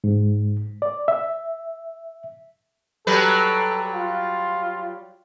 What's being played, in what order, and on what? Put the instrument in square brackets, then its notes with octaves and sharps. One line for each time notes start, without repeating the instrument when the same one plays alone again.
[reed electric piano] G#2
D5
E5
[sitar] F#3 G3 B4 [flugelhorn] A4
[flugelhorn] F4